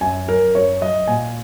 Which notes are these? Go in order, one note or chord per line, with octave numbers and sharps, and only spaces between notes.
F#2 G#5
F#3 A#4
F#2 C#5
F#3 D#5
A#2 G#5